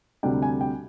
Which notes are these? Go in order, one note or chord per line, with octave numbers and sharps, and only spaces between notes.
D2 C3 G3 D4 G5
G#5
G5